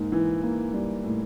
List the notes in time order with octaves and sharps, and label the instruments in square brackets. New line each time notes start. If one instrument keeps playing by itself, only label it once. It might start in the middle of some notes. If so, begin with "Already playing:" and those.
Already playing: [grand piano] G#2 A#3
E3
A#3
G3
A2